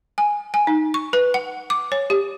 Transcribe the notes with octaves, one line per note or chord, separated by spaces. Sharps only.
G#5
G#5
D#4
C#6
B4
F#5
D6
C#5
G4